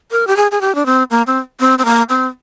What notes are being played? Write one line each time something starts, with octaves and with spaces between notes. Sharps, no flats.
A#4
G4
G#4
G#4
G4
D4
C4
A#3
C4
C4
C4
A#3
C4